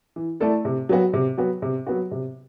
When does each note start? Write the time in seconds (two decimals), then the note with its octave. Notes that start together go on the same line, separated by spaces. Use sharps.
0.16 E3
0.40 A3 E4 A4 D5
0.65 C3
0.89 F#3 B3 F#4
1.13 C3
1.38 F#3 B3 F#4
1.62 C3
1.87 F#3 B3 F#4
2.11 C3